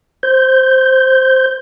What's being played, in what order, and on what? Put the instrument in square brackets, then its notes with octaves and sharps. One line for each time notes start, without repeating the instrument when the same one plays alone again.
[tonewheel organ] C5 G6